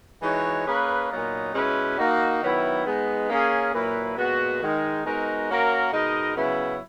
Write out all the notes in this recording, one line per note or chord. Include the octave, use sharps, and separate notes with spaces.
E3 G#3 D#4 F#4 C#5
A#3 C#4 G#4 B4
A#2 F#3 B3 D#4
B2 G#3 C#4 E4 B4
A#3 D#4 F#4
D#3 F#3 B3 E4 B4
G#3 B3 D#4
A#3 C#4 G#4
A#2 F#3 A#3 E4 B4
A#2 G#3 B3 F#4
D#3 G#3 D#4
G#3 B3 D#4 F#4 A#4
A#3 C#4 F#4 A#4
B2 G#3 D#4 A#4 D#5
C#3 F#3 B3 E4